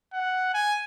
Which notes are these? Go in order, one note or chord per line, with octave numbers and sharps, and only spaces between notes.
F#5
G#5